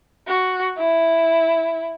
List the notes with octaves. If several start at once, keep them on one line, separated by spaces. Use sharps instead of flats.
F#4
E4